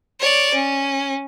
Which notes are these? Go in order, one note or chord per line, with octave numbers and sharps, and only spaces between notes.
C#5 D5
C#4